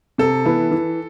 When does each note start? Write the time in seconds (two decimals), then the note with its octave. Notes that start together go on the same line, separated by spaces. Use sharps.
0.18 C3 A4
0.45 E3 B3 E4
0.71 E3